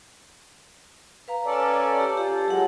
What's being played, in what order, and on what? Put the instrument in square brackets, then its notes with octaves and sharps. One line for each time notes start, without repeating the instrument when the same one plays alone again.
[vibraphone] B4 F5 A#5
[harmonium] C#4 A4 D5
[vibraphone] G4
[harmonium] F4 [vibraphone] G4 A5
[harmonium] F#3 G#3 [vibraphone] G4 F#5